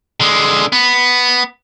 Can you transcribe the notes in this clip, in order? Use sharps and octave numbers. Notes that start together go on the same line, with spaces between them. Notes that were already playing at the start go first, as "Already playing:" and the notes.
D3 G#3
B3